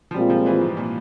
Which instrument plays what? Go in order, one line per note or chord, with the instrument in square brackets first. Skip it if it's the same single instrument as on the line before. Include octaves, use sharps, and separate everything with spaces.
[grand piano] F3
[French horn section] A#2 G#3 C4 F4 [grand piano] G3
[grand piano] F3
E3
G#2
A#2